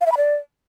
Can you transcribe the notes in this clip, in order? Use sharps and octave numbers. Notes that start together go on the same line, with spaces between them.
F5
E5
B5
D5